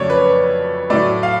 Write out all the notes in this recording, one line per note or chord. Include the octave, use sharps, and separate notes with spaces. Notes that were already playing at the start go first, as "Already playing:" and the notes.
Already playing: F2 C#3 F#3 A3 C#5 D5
B4
A2 F#3 A3 D5
F5